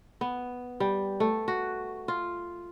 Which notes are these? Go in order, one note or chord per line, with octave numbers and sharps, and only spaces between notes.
B3
G3
A3
F#4
F4